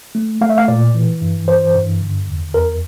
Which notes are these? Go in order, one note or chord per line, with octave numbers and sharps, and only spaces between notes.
A3
A3 F5
E5
F5
A#2 D5
E3
G2
E3 C5
G2
D3
E2
E2 A#4